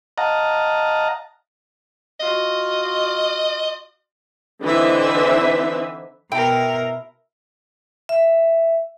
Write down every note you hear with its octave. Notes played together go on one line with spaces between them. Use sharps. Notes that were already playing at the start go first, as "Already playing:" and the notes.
D#5 F5 F#5 A5 A#5
F4 F#4 D#5
D3 E3 C4 D#4 B4 E5
B2 E4 A#4 G5
E5